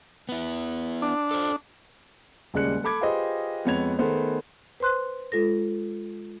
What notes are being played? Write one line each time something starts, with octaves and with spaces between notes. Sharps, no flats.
B3 E4
D4
A4 C5
D#1 C#3 G#3 D5 F#6 C#7
A4 B5 D6 G#6
F4 G4 G#4 B4 C5 D#5
F2 G#3 B3 C#5 G#6 F7
D#3 A3 B3 G#4 C5
B4 C5 C6 F#6
G#3 F4 A4 A#6